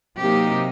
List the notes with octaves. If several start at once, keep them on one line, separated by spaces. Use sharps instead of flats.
C3 F#3 A#3 D#4 G4